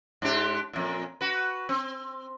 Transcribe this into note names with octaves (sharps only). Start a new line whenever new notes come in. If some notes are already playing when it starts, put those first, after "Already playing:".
G#2 D4 G4
F2 A#2
F#4 B4
C4